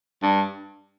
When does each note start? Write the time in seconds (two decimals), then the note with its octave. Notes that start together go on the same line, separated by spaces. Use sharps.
0.22 G2